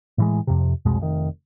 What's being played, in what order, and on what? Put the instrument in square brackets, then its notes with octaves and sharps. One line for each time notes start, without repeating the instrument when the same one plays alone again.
[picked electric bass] A2 E3 G#3
F2 C3
C2 F2 B2 G#3
F1 D#3